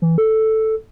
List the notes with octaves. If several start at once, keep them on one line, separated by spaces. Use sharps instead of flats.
E3
A4